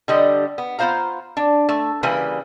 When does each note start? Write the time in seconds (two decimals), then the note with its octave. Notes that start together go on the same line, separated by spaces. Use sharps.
0.08 D3 G3 D#5
0.58 B3
0.79 B3 F4 C5 F5 A#5
1.37 D4
1.69 A3
2.03 C#3 E3 G3 A#3 B4